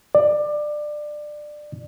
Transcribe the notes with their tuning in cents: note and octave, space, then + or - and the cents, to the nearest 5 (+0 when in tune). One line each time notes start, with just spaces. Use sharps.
D5 +20